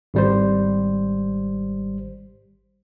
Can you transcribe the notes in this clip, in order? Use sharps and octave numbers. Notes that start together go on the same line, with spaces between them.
G#1 G3 C5